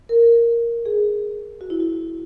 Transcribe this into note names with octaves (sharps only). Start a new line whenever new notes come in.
A#4
G#4
F#4
E4
F#4